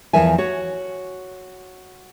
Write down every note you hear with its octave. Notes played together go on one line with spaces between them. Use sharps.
E2 E3 F3 A#4 E5 G#5
F#4 C#5